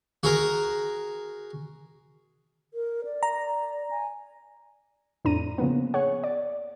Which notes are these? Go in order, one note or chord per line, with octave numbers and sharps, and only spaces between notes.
F#4 G#4 A#4
A#4
D5
A#5
G#5
F2 A2 D4 A#5 D#7
C#3 F3 A#3 B3
G#4 C#5 F#5
D5